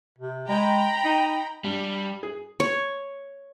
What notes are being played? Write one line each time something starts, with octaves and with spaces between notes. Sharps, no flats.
C3
G#3 G5 A#5 B5
D#4
G2 G3
G#4
C#5